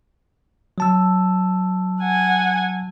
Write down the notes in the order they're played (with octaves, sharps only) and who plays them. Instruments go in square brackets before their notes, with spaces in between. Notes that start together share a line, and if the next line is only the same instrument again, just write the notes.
[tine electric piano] F#3 A5 E6
[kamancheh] F#5 G#5